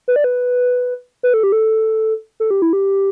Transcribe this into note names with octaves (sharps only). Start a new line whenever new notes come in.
B4
D5
B4
B4
A4
G4
A4
A4
G4
E4
G4